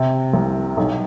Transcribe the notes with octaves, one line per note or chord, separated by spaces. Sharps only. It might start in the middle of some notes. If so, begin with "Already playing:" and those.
Already playing: C3
C2
B1